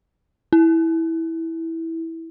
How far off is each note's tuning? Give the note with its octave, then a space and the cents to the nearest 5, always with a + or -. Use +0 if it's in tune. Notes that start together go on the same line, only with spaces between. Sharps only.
E4 -10